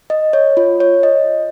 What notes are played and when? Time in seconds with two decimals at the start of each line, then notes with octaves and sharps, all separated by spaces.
0.10 D#5
0.33 C#5
0.57 F4
0.80 C#5
1.03 D#5